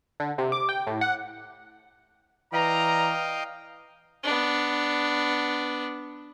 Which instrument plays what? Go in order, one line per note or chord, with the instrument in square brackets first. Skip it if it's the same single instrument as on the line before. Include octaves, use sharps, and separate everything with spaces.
[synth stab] D3
C3
D6
G5
A2
F#5
[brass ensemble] E3 D5 A#5 [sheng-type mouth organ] D#5 F5 G5
[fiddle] B3 D4